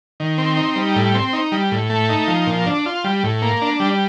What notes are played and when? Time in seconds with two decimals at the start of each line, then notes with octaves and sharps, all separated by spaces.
0.20 D#3
0.38 C4
0.57 D#4
0.76 G3
0.96 A2
1.15 C4
1.33 D#4
1.52 G3
1.72 A2
1.90 A3
2.09 D#4
2.28 F3
2.47 A#2
2.66 D4
2.86 F4
3.04 G3
3.24 A2
3.42 A#3
3.61 D4
3.80 G3